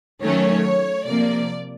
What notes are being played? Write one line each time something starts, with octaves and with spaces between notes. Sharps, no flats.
D#3 F#3 A3 C#4 C#5
C3 F3 A#3 D5